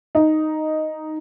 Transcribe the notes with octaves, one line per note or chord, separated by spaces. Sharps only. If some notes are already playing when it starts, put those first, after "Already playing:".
D#4